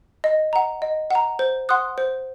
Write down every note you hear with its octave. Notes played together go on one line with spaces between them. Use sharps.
D#5
F#5 A#5
D#5
F#5 A#5
C5
F#5 C6 D#6 F#6
C5